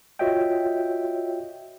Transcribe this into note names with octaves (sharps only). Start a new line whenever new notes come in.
F4 F#4 C#5 D#5 E5 G5